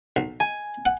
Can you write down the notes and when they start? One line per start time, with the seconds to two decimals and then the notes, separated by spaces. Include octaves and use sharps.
0.16 B1
0.40 G#5
0.86 F#5